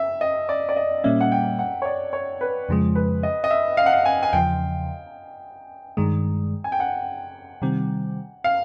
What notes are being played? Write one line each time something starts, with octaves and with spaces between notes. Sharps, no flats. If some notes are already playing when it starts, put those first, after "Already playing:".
Already playing: E5
D#5
D5
D5
D#5
A#2 G3 A#3 C#4 E5
F#5
G5
F#5
C#5
D5
C#5
B4
F2 C#3 F3 G#3
B4
D#5
D#5
E5
F5
F#5
F5
G#5
G#5
E2 C#3 F3 G5
G2 D#3 G#3
G#5
G5
F#5
C3 D#3 G3 C4
F5